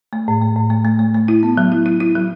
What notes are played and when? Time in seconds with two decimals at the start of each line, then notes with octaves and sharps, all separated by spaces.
0.13 A3
0.28 A2
0.41 A3
0.56 A2
0.70 A3
0.85 A3
0.99 A3
1.14 A3
1.28 E4
1.43 B3
1.57 F#3
1.72 E4
1.86 E4
2.00 E4
2.15 F#3